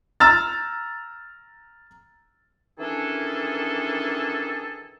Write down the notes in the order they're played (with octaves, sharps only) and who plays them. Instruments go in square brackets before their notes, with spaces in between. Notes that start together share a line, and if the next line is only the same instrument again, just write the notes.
[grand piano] A#5 E6 F6 A6
[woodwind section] D#3 E3 C#4 D4 G#4 A4